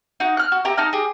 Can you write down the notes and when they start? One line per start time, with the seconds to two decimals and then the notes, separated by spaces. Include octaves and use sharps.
0.20 D#4 F#4
0.37 F6 F#6
0.52 F#4
0.65 G4 A#4 E5
0.77 D#4 A5 A#5 F6
0.93 G4 G#4